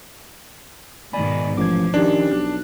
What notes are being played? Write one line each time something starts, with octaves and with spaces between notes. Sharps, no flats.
G#2 B2 D#3 D5 G#5 B5
A1 F3 D6 G#6
D#3 C#4 D4 G4
B1 F#6